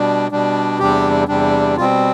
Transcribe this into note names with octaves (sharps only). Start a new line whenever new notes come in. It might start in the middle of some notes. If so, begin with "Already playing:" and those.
Already playing: B2 G3 D4
B2 G3 D4
E2 C3 G3 D4 G4
E2 C3 G3 D4
B2 G3 C4 F4